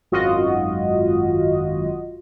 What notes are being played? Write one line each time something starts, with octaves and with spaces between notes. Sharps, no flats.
G#1 F#2 F4 F#4 D#5